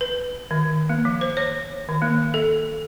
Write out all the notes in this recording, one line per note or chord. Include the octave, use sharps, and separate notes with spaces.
B4
D#3
A#3
F3
C5
C#5
D#3
A#3
A4